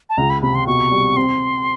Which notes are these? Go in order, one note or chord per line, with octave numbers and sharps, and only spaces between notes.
A5
C#2 A#5
B5
C3 B5
C6
B2 C#6
G3
C4 C6